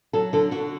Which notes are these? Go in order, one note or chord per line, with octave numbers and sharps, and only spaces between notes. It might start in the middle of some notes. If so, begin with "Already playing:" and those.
F#3 A4
D3 A4
D3 F#4